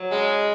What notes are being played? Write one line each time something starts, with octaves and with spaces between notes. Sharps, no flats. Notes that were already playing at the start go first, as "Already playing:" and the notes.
Already playing: F#3
C#3 G#3